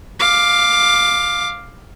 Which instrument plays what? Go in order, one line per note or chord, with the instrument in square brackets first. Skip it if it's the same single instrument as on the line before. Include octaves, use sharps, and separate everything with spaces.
[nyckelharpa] F5 D6